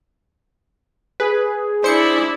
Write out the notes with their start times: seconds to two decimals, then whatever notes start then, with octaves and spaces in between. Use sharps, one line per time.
1.20 G#4 B4
1.84 D4 E4 C5 C#7